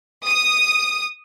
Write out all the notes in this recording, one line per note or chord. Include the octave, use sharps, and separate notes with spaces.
D#6